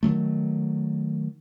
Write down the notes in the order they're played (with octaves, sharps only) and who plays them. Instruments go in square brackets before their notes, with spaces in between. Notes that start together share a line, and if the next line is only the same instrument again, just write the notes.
[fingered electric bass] D#3 E3 F#3 A3